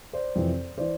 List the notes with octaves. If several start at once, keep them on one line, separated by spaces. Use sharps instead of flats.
C5 D5
F2 C3 E3
E3 C5 D5